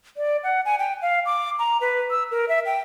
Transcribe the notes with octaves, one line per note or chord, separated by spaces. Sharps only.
D5
F#5
G#5
G5
F5
D6
A#5
B4
E6
A#4
E5
G5